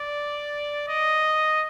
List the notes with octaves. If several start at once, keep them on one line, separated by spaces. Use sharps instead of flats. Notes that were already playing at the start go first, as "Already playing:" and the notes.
Already playing: D5
D#5